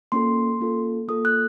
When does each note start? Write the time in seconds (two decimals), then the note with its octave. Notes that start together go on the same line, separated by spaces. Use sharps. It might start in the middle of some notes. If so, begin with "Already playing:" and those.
0.12 A#3 C#4 F4 A4 C6
0.60 A#3 C#4 F4 A4
1.08 A#3 F4 A4 D#6
1.25 F#6